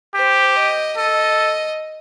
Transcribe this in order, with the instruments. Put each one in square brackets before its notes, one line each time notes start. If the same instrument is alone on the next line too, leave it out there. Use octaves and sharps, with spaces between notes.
[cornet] G4 [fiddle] C5
[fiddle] D#5
[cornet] A4 [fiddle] D#5